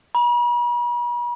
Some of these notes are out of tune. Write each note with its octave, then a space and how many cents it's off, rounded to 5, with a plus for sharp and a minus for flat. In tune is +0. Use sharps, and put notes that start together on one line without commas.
B5 -45